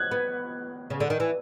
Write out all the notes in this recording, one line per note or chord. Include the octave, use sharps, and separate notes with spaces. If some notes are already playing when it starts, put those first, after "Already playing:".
Already playing: F#6 G#6
B3
C#3
D3
D#3
E3